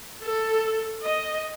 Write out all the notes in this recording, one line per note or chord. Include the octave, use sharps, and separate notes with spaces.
A4
D#5